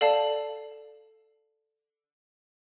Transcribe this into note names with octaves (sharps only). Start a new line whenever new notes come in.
A4 D5 F5 A5